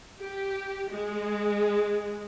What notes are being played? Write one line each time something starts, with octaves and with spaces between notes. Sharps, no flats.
G4
G#3